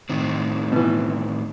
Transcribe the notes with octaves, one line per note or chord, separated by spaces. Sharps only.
A2 D#3 C4
B2 E3